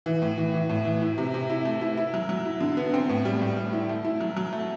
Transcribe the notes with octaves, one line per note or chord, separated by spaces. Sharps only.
E3
A2
E3
E3
A2
E3
E4
C3
C3
E4
A3
E4
E4
F#3
F#3
E4
D3
B3
C4
A2
G3
A2
G3
E4
A3
E4
F#3
F#3
A3